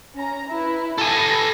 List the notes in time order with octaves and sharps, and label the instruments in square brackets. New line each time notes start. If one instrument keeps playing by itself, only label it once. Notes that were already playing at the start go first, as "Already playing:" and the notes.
[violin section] C#4 A#5
E4 B4
[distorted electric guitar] A4 G#5 [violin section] B5 A#6